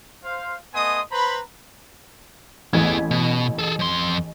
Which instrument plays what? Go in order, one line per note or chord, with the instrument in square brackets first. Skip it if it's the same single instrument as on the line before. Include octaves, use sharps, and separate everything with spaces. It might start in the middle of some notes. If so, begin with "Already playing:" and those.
[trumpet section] C5 F5
A3 B3 D#5 G#5 C6 D#6
B4 C5 A#5 B5
[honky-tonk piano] A1 G#6 [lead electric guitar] B3 G#4
[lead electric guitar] B2
G#4 A4
F2 C6